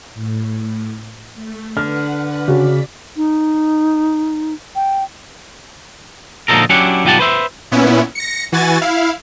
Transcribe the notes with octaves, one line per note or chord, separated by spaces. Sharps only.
A2
A3
D3 B4 F#5 F6
C#3 F#4 D5 B6
D#4
G5
A#2 D3 F3 D#4 A4 A#4
F#3 C#4 D4 E4 G4 F#5
B1 G3 F4 G4 F#5 A5
B4 C5 E5
A#2 B3 C#4 E4
A#6 C#7
E3 F#4 G#5 A6
E4 F5